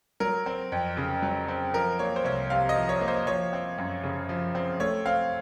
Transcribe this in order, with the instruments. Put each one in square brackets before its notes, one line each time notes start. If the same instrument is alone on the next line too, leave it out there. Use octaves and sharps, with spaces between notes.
[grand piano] F#3 A#4
C4
F2
C#3
F#3
C4
F3 A#4
A#3 C#5
C5
C2 C#5
C3 F5
D#5
F3
C#5
A#3
C5
F3 C#5
C4
F#2
C#3
F3
C4
A3 C#5
C4 F5